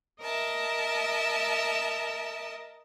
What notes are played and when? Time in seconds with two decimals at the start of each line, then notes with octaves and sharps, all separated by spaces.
0.21 A#4 D#5 E5 A5